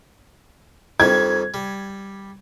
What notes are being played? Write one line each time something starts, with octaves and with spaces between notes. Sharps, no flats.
F2 D#3 G3 G#6
G3